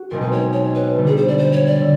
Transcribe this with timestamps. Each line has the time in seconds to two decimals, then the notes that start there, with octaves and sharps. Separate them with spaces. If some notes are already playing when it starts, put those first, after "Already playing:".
Already playing: F#4
0.11 B1 B2 G#3 C4 D#4 A#4
0.21 B4
0.32 C#5
0.53 C#5
0.74 B4
0.96 D3 G3 B3
1.06 G#4
1.17 C5
1.28 D5
1.38 C5
1.52 C#5
1.66 D5
1.81 D3